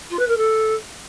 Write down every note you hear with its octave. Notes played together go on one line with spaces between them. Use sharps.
F4
B4
A#4
A4